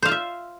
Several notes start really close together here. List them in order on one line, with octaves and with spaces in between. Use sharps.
C5 F5 F4 E5